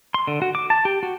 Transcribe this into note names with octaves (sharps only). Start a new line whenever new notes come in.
C6
D3
F#4
D6
A5
G4
F#4